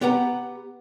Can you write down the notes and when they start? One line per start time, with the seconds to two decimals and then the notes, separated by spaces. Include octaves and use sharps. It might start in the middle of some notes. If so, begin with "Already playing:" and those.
0.01 B3 G4 B4 F#5 A#5